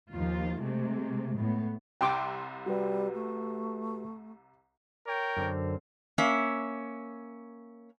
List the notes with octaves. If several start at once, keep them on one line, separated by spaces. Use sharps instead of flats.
D#2 F3 F4
C3 G#3 A3
A2 B3
C2 C3 G5 C6 D6
G3 F#4 G4 B4
A3
A#4 C#5 G5
F#2 D3 C4
A#3 C#4 E5